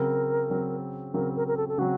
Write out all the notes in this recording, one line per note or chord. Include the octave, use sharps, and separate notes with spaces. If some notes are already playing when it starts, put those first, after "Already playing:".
Already playing: C#3 F#3 C4 A#4
C#3 F#3 C4
C#3 F#3 C4 A#4
A#4
A#4
A4
A4
C#3 F#3 C4 F#4